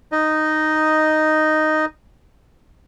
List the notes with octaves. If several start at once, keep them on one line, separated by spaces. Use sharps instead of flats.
D#4 D#5